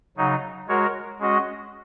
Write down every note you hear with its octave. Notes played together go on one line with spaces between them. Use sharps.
C#3 F#3 D#4
G#3 F#4 A#4 C#5
G#3 C#4 F#4 D#5